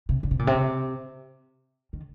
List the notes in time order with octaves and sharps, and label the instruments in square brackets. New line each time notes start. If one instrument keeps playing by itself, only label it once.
[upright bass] C3
D3
C3
A#2
C3
D#3